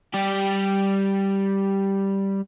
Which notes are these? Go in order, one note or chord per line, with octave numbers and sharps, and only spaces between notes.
G3 G4